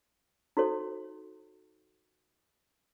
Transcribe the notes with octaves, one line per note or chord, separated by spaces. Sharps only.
D#4 F#4 A4 C5